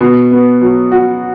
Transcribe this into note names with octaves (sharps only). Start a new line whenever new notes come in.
B2
B3
F#3
F#4